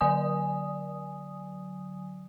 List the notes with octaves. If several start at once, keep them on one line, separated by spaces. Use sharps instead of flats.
D3 F#3 D5 G#5 D#6